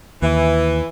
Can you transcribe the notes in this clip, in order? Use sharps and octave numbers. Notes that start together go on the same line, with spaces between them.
D#2 E3